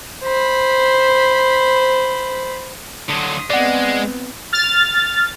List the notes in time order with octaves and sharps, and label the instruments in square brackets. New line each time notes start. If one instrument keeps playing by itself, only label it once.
[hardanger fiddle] C5 B5
[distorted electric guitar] D3 F#3 [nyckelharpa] C6 D#6
[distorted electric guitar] G#3 [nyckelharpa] B3 C4 [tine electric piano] D5 F#5
[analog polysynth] F6 A6